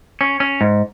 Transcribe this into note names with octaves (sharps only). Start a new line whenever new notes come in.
C#4
C#4
G#2